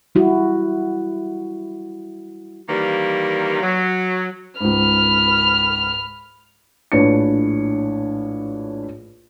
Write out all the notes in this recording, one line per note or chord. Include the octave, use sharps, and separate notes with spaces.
G3 E4 F#4
D#3 E3 G3 A#3
F#3
C#2 G#2 B5 F6
A#1 A2 D4 B4 C#5 C#7